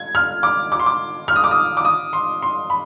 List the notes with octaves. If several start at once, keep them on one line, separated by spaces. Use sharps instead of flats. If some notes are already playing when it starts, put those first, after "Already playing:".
Already playing: G#6
F6
D6
D6
C6
D6
F6
D#6
D6
D#6
D6
D#6
C6
C6
B5